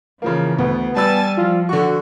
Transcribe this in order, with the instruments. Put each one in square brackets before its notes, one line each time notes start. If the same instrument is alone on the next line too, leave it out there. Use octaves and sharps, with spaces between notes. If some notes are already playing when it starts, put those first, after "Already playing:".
[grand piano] C#3 F3 A#3 [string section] E3
[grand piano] D2 [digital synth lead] B3
[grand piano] G3 B5 E6 [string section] G#5 A5 A6
[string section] F3 [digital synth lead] F4
[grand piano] D3 C#6 [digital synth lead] F#4